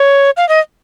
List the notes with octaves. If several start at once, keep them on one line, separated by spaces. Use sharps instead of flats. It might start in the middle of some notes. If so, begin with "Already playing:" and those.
Already playing: C#5
F5
D#5